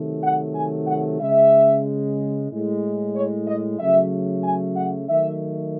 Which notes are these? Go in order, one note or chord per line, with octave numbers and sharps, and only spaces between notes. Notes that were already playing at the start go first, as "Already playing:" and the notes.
Already playing: C3 D#3 F#3 A3
F#5
G#5
F#5
C#3 G#3 E5
A2 G#3
C#5
D#5
C#3 F#3 A3 E5
G#5
F#5
D#3 F#3 A3 E5